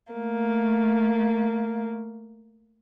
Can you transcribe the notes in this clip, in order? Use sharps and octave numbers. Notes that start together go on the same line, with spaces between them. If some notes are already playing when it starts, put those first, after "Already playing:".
A3 A#3